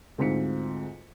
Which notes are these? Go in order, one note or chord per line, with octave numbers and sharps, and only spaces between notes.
D2 G#2 C4 F4 B6 C#7